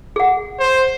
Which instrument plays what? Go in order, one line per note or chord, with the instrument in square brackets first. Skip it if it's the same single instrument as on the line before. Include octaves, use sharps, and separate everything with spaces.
[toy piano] G#4 F#5
[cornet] C5